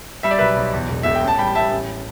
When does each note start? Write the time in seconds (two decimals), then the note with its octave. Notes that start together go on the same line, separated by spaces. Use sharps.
0.23 G3 E5
0.31 D5
0.39 B1 B4 E5
0.56 B1
0.73 E2
0.89 E1
1.03 E1 E5
1.15 G5
1.22 A1
1.28 A5
1.39 G3 G5 B5
1.55 G3 E5 A5
1.71 A1